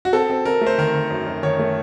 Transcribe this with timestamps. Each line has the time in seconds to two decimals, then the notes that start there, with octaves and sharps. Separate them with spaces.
0.05 F#4
0.13 C4 A4
0.30 C4
0.45 C4 A#4
0.61 A3
0.67 C5
0.78 D#3 A#4
0.94 D#3
1.10 F#2
1.26 F#2
1.43 D#3 C#5
1.59 A3